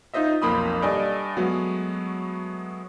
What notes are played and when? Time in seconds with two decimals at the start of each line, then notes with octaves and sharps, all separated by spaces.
0.14 D#4 F4 C5 D#5 E5
0.42 B1 F2 A#3 B5 C6 D#6
0.82 G2 A4 D5 D#5 G#5
1.37 F#3 G#3 A3 B3 F#4